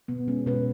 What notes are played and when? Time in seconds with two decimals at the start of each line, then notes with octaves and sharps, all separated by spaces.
0.08 B2 B3
0.28 G#3 C#4
0.46 B2 B4